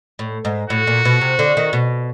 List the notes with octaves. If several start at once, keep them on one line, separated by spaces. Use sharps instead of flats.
A2
G#2
A2 F#4
A#2
B2
C3
D3
D#3
B2